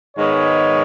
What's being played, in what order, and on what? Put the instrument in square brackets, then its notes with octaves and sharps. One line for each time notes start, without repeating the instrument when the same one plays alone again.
[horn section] G#2 D#3 G#3 B3 C#5